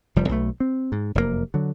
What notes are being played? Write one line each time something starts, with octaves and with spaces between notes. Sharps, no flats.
F1 F3 G3
B1 B2 A3
C4
G#2
F1 F#2 A2 A#3
D3 F#3